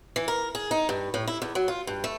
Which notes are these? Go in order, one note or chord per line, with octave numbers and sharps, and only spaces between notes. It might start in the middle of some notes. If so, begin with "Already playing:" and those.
E3
A#4
G#4
D#4
G2
A2
E4
E2
F#3
F4
G2
A3